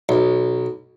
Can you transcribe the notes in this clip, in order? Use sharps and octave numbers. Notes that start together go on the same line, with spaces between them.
B1